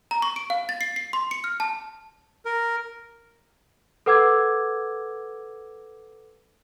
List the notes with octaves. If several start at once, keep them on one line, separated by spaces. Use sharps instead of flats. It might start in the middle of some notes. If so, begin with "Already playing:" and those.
A#5
C#6
D7
F5
A6
C7
C7
C6
C#7
F6
A5
A#4
A4 B4 F#5 D6 E6 G#6